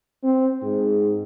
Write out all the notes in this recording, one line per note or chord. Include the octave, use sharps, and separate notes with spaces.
C4
G#2